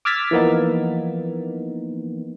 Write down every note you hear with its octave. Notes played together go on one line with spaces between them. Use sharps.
D6 E6 F6 G#6 A6 B6
E3 F3 A#3 B3 D#4